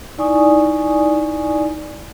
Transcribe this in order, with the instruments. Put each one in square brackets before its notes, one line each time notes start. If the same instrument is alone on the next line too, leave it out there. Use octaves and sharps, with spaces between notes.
[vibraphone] D#4 E4 D5 G#5 C#6 D#6